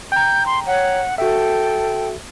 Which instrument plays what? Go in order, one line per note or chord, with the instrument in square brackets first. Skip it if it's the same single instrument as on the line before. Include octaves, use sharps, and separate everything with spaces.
[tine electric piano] G5 A#5 [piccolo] G6
[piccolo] C6
[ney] C#5 [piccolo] F#5
[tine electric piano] F#4 E5 [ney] A4 [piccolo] G5